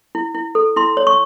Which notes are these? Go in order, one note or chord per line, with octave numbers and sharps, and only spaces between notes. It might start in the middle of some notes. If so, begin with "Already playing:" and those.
E4
E4
A4
E4 C6
C#5
C#6